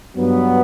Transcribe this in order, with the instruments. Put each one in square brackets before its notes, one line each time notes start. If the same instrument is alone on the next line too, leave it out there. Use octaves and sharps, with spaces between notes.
[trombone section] G2 F#3 B3